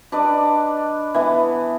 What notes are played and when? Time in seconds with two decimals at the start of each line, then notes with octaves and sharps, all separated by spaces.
0.12 D4 B4 D5 D#5
1.14 E3 B3